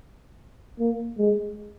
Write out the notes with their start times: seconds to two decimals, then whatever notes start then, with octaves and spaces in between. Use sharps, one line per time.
0.79 A#3
1.18 G#3